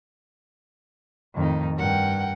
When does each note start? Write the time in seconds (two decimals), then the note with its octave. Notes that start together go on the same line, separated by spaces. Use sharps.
1.36 F2 A2 D#3 D#4
1.77 G2 A#4 F#5 G5